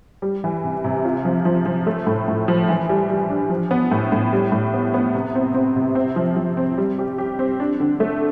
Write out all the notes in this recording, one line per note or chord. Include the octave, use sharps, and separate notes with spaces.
G3
E3
C3
C3
F4
F3
F3
F3
A3
A2
A2
F3
E3
G3
G3
D4
F3
B3
A2
A2
G3
A2
B3
B3
C3
C4
C4
C3
C4
F3
F3
C4
G3
G4
G4
C4
D4
D3
A3